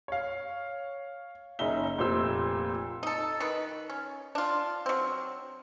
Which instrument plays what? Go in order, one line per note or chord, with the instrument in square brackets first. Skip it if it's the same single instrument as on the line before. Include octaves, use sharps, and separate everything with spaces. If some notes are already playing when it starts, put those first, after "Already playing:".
[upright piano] C#5 F5
F#1 C#4 D#4 E5 G7
F1 A#2 C5 E6
[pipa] D#4 A4
D#3 B4
C#4
D4 F4
F#3 C4